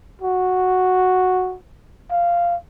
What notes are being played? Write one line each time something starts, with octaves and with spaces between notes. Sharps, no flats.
F#4
F5